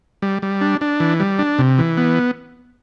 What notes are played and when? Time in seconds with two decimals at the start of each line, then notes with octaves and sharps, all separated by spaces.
0.22 G3
0.42 G3
0.61 D4
0.81 D4
1.00 E3
1.20 G3
1.39 D4
1.59 C3
1.78 E3
1.97 B3